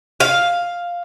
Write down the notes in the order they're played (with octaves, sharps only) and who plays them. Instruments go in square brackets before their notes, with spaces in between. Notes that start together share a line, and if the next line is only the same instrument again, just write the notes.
[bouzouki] F5